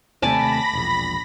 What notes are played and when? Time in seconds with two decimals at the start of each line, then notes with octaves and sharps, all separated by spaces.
0.22 D#2 C3 A3 D5 G#5 A5 B5 A#6
0.73 E1 A#1